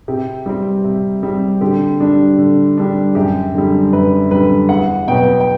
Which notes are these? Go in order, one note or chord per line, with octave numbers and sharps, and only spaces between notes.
C3 G4
G3 C4
C3
G3 C4
D3 G4
G3 D4
D3
G3 D4
F#2 G4
D3 G3
F#2 B4
D3 G3 B4
E2 F#5
B2 F#3 B3 G5
G5